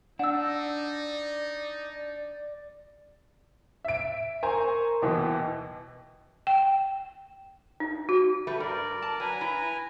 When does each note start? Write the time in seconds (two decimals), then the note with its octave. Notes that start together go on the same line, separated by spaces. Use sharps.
0.19 D4 D#4 D5 F#5 E6
3.85 E5 D7
4.43 A#4 C5 G#5 A#5 C#6
5.02 D#2 B2 E3 D#5 G5
6.47 G5
7.80 D#4
8.09 F#4
8.47 G3 A3 B4
8.60 G2 A#4 D5
9.02 A5
9.20 F#3 B4 G#5 A#5
9.41 E4